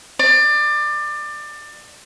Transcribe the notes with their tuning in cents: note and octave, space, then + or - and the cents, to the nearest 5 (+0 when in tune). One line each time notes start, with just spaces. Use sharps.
D5 +25